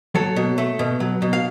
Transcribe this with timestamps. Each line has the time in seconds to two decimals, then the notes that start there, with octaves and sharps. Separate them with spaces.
0.15 F#3 A4 C#5
0.36 B2
0.58 A3
0.79 B2
1.00 F#3
1.22 B2
1.33 F5